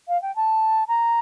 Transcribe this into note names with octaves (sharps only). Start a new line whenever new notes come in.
F5
G5
A5
A#5